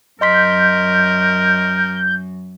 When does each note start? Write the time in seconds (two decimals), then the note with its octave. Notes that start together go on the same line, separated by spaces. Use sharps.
0.21 F#2 A#4 D#5 C6 G6 B6